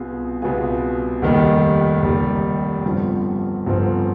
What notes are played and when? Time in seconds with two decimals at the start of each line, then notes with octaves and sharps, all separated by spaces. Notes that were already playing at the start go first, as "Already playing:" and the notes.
Already playing: C2 B2 B3 F4 G#4
0.42 C2 B2 B3 F4 G#4
1.22 F1 D#2 D#3 G3
2.03 F1 D#2 D#3 G3
2.85 G1 G2 F3 C4
3.66 G1 G2 F3 C4